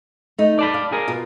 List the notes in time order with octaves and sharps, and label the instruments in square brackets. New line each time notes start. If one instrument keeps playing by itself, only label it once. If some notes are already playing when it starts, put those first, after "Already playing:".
[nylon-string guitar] A3 D#4
[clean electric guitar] D5 A5 B5
[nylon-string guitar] F5
[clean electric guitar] G#4 A#4
[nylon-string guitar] B2 F4